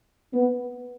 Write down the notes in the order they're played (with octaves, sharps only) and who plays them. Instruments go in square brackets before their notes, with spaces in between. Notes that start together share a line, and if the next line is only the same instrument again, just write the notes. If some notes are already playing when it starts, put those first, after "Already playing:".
[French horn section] B3